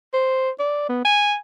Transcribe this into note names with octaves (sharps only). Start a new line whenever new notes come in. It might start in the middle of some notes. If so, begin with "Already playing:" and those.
C5
D5
B3
G#5